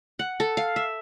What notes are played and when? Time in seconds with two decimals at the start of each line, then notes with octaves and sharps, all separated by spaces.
0.19 F#5
0.40 A4
0.57 F5
0.76 E5